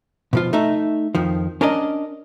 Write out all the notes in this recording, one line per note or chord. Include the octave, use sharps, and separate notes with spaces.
B2 F3 F4
A3 D#4 E5
F2 D#3 F3
C#4 D4 A#4 D5 D#5